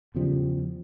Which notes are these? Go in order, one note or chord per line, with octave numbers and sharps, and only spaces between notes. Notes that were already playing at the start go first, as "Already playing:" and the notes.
E2 C#3 F3 G3